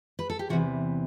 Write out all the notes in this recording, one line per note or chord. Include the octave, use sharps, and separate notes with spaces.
B4
A4
G4
E2 C3 E3 F#4